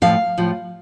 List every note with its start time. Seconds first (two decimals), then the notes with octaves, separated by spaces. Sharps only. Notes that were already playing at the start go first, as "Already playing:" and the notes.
0.02 A2 F3 F5
0.38 A2 F3